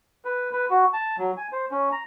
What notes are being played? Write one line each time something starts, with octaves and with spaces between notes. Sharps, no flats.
B4
B4
F#4
A5
F#3
G#5
C5
C#4
A#5